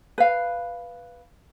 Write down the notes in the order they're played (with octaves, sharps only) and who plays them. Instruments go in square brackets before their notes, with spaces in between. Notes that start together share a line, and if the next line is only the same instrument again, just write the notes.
[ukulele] B4 F5